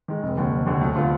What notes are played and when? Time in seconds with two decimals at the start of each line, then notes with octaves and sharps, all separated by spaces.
0.08 D#3 G#3
0.23 F1
0.37 D#2 D3
0.52 F1
0.66 D#2 D3
0.81 D2
0.96 D3 F3 B3 F4